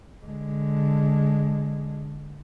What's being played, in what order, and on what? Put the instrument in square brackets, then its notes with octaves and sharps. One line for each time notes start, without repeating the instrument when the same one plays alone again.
[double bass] D3 G#3